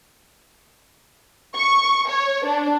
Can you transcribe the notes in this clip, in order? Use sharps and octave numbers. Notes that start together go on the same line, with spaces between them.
C#6
C#5
D4